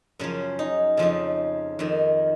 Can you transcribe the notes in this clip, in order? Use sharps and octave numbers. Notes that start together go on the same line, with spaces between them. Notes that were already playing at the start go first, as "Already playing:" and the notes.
F#2 C#3 F3 C#4
D#4
F2 C#3 F3 D#4
F2 D#3